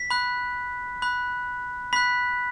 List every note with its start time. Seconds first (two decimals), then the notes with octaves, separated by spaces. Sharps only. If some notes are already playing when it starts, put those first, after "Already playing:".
Already playing: B6
0.10 B5 F#6
1.02 B5 F#6
1.93 B5 F#6 B6